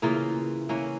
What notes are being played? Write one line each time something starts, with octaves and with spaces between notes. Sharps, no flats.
C#3 E3 A#3 F4
E3 A#3 C#4